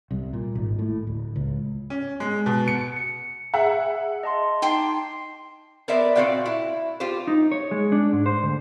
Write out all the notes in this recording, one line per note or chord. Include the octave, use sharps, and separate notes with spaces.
C2
A#2
G#1
A2
D1
C#2
C#4
G#3
B2
C#7
C#7
G#4 E5 F#5
D#5 A5 C6
D#4 G5 A5 C6 D6 C7
B3 A#4 C5 D5 E5
A#2 C4 F#4 D5 F5 G5
E4
F4 G4 C5
D#4
C#5
G#3
D4
G#2
C5
D2